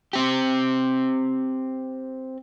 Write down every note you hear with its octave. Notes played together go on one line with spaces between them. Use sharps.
C4 G4